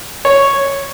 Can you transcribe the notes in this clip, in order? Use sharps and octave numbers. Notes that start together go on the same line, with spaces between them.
C#5